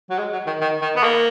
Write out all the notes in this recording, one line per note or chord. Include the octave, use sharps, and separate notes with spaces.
F#3
G#3
F#3
D#3
D#3
D#3
B3
A#3